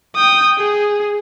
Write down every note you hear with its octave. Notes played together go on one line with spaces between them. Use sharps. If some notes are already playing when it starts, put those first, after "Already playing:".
G5 D#6
G#4